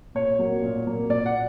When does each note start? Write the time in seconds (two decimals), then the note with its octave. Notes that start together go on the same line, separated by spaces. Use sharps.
0.15 A#2 C#5
0.39 F#3 A#3
0.62 A#2
0.86 F#3 A#3
1.10 A#2 D5
1.26 F#5